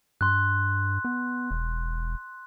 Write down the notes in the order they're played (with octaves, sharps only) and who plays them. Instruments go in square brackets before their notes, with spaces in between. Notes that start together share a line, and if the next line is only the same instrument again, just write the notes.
[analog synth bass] G2 [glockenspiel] C6 F#6
[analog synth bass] B3
E1